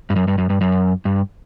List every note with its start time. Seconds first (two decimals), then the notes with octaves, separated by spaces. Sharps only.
0.10 G2
0.16 F#2
0.28 G2
0.38 F#2
0.50 G2
0.61 F#2
1.05 G2